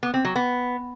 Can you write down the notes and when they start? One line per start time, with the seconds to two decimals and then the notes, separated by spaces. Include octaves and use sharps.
0.03 B3
0.14 C4
0.25 F#3
0.36 B3